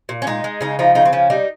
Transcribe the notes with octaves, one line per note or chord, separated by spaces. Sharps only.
A#2
C#4
G#3 D#4
G#3
C#3 D#4
F3 D#4
C#3 D#4
C4
F3 C#4
G3 D#4